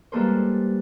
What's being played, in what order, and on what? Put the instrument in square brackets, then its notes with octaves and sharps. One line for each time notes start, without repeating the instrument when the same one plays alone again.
[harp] G3 G#3 A#3 A4 B4 C5